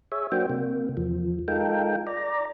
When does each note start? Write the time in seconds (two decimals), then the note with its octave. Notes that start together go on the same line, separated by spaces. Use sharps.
0.12 G#4 C#5 E5
0.32 F#3 A#3 D4 F#4 C5 G5
0.50 C3 A#3
0.97 E2 F3
1.48 G#3 D#4 F4 A4 A#4 G5
2.07 D5 A#5